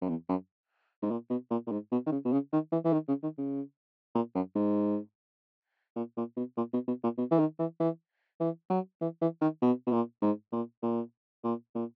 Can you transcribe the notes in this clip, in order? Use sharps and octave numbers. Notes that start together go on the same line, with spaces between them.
F#2
E2
F#2
G#2
A#2
B2
A#2
A#2
G#2
B2
D#3
C#3
B2
C#3
D#3
E3
E3
D#3
C#3
D#3
C#3
A#2
F#2
G#2
A#2
A#2
B2
A#2
B2
B2
A#2
B2
E3
D#3
E3
E3
E3
F#3
E3
E3
D#3
B2
B2
A#2
G#2
A#2
A#2
A#2
A#2